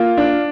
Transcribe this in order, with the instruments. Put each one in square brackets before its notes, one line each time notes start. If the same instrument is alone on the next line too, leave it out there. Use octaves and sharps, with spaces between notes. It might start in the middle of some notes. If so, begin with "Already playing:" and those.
Already playing: [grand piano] A#3 [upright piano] F4
[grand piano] D4